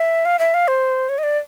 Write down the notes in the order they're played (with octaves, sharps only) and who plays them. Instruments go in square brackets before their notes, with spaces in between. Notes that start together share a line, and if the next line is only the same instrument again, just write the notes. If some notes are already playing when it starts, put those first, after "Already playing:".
Already playing: [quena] E5
F5
E5
F5
C5
C#5
D#5
D5